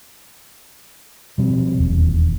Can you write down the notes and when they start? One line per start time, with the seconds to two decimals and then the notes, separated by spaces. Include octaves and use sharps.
1.38 B2 F3 G3 C4
1.78 E1 D#2